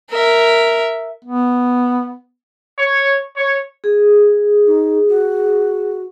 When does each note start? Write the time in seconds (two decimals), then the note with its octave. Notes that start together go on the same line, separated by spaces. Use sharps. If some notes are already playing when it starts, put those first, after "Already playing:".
0.10 A#4 E5
1.25 B3
2.79 C#5
3.37 C#5
3.84 G#4
4.67 D#4
5.09 F#4